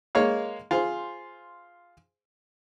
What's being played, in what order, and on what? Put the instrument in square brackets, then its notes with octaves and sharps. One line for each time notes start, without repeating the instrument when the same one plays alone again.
[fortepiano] G#3 A#3 C#5 F5
F4 G#4 C5